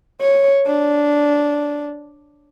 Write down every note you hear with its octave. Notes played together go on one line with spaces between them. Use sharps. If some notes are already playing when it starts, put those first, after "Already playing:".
C#5
D4